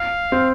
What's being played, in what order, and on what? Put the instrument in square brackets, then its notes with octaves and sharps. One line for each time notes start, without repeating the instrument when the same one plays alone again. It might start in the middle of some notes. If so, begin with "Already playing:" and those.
Already playing: [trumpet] F5
[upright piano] C4